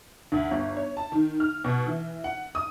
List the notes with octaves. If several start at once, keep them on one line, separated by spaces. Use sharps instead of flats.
D2
G1
C#5
A5
D#3
F6
B2
E3
F#5
D#6